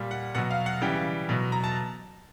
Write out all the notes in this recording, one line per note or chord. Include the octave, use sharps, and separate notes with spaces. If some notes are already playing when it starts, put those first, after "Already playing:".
Already playing: A#2 G3
F#5
B2 F#3 F#5
F5
F#5
C#3 E3 G3 G5
B2 F#3
A#5
A5